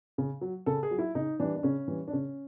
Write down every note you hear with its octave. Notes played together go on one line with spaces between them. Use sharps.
C#3
F#3
C#3 A4
G#4
F#3
E4
C#3 D#4
E3 G3 D4
D4
C#3 C#4
E3 G3
D4
C#3 C#4